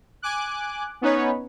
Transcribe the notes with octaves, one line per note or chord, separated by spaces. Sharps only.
G#5 D6 F#6
B3 C#4 D#4 B4 C#5